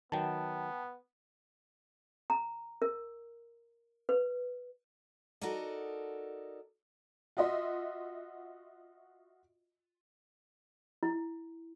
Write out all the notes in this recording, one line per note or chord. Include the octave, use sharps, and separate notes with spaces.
D#3 F#3 B3 G5 A5
A#5
A#4
B4
D#4 F#4 A4 A#4 D5 D#5
F4 F#4 D#5 E5 C6
E4